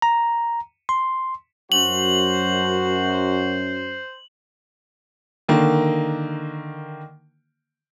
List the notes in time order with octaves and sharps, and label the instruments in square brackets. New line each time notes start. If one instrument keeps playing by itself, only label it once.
[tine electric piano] A#5
C6
[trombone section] F#2 [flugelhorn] F#4 [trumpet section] C5 [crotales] F#7
[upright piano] D3 D#3 A#3